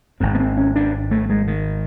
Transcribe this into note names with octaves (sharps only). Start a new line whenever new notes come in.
G#1 G#2 C4
B3
C4
C#4
D4
A3
G#3
D#3